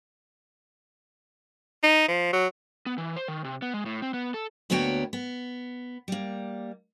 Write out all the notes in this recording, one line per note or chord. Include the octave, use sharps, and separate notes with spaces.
D#4
F3
F#3
B3
E3
C5
D#3
C3
B3
G#3
A2
C4
B3
A4
D2 A#3 B3 F#4 C#5 G5
B3
G3 A#3